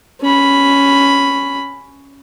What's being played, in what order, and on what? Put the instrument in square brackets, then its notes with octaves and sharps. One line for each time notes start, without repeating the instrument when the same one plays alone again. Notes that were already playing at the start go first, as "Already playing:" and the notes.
[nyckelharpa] C#4 B5